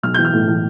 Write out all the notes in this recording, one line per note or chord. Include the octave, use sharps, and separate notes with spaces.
B1 F6
E3 G6
F6
A2
E3